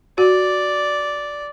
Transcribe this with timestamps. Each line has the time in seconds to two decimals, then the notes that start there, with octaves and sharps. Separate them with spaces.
0.18 F#4 D5